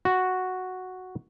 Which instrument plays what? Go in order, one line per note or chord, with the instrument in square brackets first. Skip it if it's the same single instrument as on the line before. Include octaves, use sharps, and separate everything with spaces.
[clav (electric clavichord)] F#4